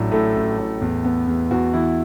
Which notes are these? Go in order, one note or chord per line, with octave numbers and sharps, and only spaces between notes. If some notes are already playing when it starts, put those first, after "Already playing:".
Already playing: A1 A2 F#3 D4
A2 A3 A4
A1
A2
E2
B3
E2
E2 F#4
E3 E4